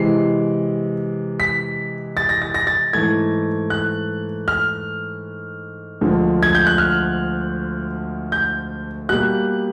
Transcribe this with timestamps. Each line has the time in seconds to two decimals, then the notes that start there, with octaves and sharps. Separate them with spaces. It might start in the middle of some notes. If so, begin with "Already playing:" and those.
Already playing: C3 E3 G#3 C7
1.40 B6
2.17 A6
2.29 A#6
2.42 A6
2.54 A#6
2.67 A6
2.93 G#2 E3 A3 G#6
3.70 F#6
4.48 F6
6.01 D2 D3 F3 G#3
6.43 G#6
6.55 G6
6.67 F#6
6.78 F6
8.32 G6
9.09 B2 G3 A#3 F#6